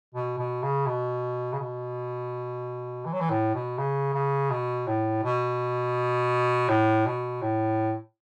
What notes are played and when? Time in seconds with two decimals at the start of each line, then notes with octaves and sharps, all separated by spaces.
0.14 B2
0.38 B2
0.63 C#3
0.86 B2
1.53 C#3
1.59 B2
3.05 E3
3.13 F#3
3.20 E3
3.30 A2
3.54 B2
3.78 C#3
4.14 C#3
4.51 B2
4.87 A2
5.23 B2
6.69 A2
7.06 B2
7.42 A2